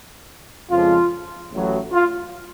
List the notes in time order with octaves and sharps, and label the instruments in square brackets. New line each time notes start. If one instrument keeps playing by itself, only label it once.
[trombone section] F2 C#3 F3 G#3 F4
A1 A2 F#3
F4